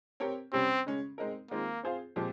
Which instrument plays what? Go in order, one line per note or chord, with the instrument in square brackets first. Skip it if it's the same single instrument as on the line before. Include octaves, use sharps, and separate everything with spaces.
[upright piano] C4 G4 A#4 C#5
[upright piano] C3 G3 C#4 G4 [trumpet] C4
[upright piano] C#3 G#3 C#4
G#3 C4 D#4 A#4
[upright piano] D#3 G#3 C4 F4 [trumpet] A#3
[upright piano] C4 F4 G#4 C5 F5
A#2 F3 G#3 C4 G4